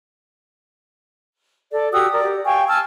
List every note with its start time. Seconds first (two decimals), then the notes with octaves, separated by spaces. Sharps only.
1.72 A4 D5
1.93 F#4 G4 D#6 E6
2.12 A#4 D5
2.24 G4
2.46 F5 G5 G#5 C#6
2.68 G#5 A5 E6 F6